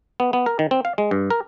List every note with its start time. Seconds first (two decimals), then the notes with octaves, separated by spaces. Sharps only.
0.20 B3
0.33 B3
0.46 A#4
0.59 D#3
0.71 C4
0.85 F5
0.98 G#3
1.11 G2
1.30 A#4